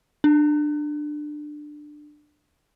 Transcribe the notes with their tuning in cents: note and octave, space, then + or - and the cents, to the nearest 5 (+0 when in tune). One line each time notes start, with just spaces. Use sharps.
D4 +20